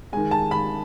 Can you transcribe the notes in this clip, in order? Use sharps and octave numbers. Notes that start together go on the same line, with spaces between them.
D#3 G#3 G#5
A5
B5